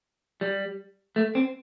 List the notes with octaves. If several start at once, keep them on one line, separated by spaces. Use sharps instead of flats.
G3
A3
C4